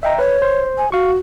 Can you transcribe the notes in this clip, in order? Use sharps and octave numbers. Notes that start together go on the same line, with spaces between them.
D#5 E5 G5 A#5
B4 C#5
C5
G#5
F#4 F5 C#6